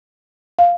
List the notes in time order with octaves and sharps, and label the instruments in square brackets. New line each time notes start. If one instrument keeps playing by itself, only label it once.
[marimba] F5